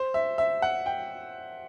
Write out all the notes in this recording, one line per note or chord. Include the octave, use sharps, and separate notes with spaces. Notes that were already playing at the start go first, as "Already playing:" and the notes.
Already playing: C5
E5
E5
F#5
G5